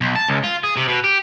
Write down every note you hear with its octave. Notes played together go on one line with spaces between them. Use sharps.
B1
A5
C#2
F4
G#4
C3
B2
G4